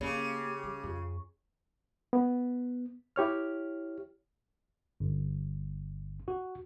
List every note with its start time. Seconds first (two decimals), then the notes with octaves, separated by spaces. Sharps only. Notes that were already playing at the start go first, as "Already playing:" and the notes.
0.01 C#3 A#3 G4
0.64 G#3
0.83 F2
2.13 B3
3.16 E4 G4 C#5 F6
5.00 G1
6.28 F#4